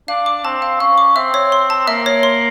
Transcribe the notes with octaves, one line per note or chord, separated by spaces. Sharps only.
D4 F5
D6
C4 A5
F5
C#4 F5
D6
C4 E5
C#5
C6
A5
A#3 E5
C#5
C6